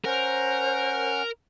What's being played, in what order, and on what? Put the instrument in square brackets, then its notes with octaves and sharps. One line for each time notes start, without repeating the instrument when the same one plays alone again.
[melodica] C#4 F#5 [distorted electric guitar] A#4 [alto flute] C5